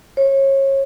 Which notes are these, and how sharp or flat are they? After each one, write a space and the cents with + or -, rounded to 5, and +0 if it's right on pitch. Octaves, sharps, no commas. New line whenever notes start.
C#5 -30